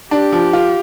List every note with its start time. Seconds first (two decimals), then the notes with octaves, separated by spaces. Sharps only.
0.11 D4 G4
0.32 F3
0.53 F4